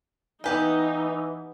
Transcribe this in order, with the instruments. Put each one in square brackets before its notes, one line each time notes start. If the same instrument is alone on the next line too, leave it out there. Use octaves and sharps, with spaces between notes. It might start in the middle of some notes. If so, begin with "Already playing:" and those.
[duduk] E3 [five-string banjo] B3 G4 G5 [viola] D#4 [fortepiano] B4 G#5